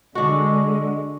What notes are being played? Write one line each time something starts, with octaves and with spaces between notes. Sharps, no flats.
D3 G#3 D4 F#4 D#5